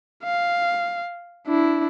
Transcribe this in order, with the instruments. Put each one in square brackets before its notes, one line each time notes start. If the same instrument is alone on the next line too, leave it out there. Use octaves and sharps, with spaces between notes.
[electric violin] F5
D4 E4